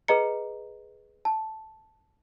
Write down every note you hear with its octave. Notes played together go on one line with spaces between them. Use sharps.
G#4 B4 D#5 A#5 C#7
A5